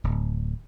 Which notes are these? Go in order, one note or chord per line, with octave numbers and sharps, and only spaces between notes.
D1